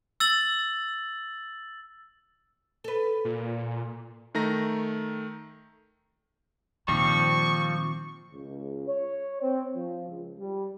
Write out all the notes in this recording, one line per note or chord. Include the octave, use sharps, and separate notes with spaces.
E6 A6 F#7
A4 B4
A#2
D#3 A3 A#5 A#6
A#2 D#3 F3 G3 C4 C#6
C#2
C#5
C4
F3
C#2
G3